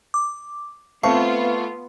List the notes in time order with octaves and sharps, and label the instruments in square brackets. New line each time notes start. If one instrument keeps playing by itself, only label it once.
[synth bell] D6
[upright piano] A3 C#6 [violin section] B3 F4 [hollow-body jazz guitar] C4 C5 F5 [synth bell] A5